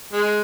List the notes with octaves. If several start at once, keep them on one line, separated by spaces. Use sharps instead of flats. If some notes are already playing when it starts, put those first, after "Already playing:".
G#3